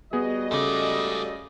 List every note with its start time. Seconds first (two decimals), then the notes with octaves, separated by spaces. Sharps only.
0.13 G3 B3 F#4 G#4 D#5
0.51 G#2 C#3 A3 G#4 D5